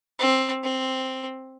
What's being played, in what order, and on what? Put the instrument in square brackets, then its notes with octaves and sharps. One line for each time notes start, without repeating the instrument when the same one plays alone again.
[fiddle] C4
C4